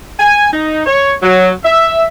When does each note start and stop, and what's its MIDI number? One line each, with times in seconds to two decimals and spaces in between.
0.20 0.49 80
0.53 0.83 63
0.86 1.13 73
1.23 1.50 54
1.64 2.05 76